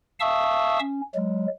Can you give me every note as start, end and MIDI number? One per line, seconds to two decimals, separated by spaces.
0.20 0.79 76
0.20 0.79 77
0.20 0.79 81
0.20 0.79 85
0.20 0.79 87
0.20 0.79 88
0.79 1.01 61
1.15 1.46 54
1.15 1.46 56